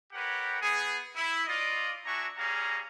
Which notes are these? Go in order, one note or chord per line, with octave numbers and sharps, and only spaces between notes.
G4 A#4 B4 C#5 F#5
B3 G#4
E4
F4 D5 D#5
D4 F#4 E5 G#5 A#5 C#6
G3 C#4 G#4 F5 A#5